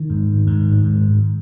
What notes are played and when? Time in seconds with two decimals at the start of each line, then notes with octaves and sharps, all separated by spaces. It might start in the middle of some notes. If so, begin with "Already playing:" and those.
Already playing: D#3
0.10 G#2
0.47 G#2
0.84 G#2